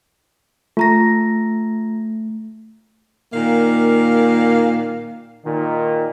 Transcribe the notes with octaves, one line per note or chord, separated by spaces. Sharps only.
A3 F4 A#5 A#6
A#2 D#3 A#3 F5
A#2 D#3